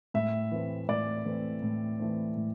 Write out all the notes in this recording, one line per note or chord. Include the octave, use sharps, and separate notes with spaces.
A2 E5
E3 A3 C4
A2 D5
E3 A3 C4
A2
E3 A3 C4
A2